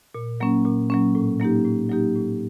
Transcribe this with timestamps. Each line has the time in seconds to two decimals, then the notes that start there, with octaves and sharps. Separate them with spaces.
0.15 A#2
0.40 F#3 A#3 C#4
0.65 A#2
0.90 F#3 A#3 C#4
1.15 A2
1.40 F#3 A#3 D#4 G4
1.65 A2
1.89 F#3 A#3 D#4 G4
2.15 A2